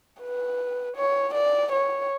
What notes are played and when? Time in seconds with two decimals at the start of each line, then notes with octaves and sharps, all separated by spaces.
0.21 B4
0.97 C#5
1.34 D5
1.72 C#5